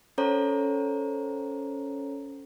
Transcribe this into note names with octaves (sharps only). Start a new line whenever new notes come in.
C#4 A4 C5 C#5 A#5